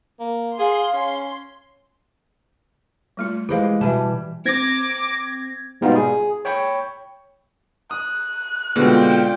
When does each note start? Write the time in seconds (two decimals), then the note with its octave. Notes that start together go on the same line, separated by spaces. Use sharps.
0.20 A#3
0.58 G#4 F5 C6
0.93 C#4
3.17 G3 A3 F4
3.49 E3 G#3 G4 C5 F5
3.81 B2 E3 G3 E5 G#5 A5
4.45 C4 D6 G#6 A#6
5.81 G#2 B2 G3 B3 D#4 F4
5.96 G#4
6.45 C#5 G5 B5 C#6
7.91 D#6 F#6
8.76 B2 D3 G#3 C4 F4 D5 G5